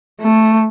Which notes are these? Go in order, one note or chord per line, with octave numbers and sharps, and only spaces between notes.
A3